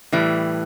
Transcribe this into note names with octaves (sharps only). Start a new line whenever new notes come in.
A2 E3 G3